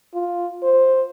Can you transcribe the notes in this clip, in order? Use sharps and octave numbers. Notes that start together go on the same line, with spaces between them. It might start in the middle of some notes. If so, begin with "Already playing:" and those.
F4
C5